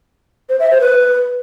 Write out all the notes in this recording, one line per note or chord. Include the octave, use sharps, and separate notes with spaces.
C5
E5
C5
B4